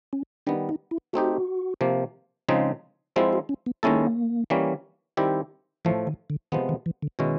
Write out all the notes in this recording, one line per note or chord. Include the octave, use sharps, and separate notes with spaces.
C#4
D#3 G3 B3 D4
D#4
E4
A3 C4 D#4 F#4 G4
C3 F3 A#3
C#3 F3 G#3 C4 D#4
F3 G#3 C4 E4 F#4
F#4
C#4
B3
D#3 G#3 A#3 C#4 E4 A4
E3 G3 A#3 C#4
D#3 G3 C4 E4 G4
A2 E3 F3 A3
D#3
D3
C3 D#3 F3 G#3 B3
D#3
E3
D3
B2 D#3 G#3 C#4 E4